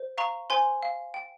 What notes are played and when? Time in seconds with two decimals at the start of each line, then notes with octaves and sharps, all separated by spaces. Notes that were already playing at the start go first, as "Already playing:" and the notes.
Already playing: C5
0.18 F5 A#5 C#6
0.50 C5 G#5 C6
0.83 F5
1.14 G5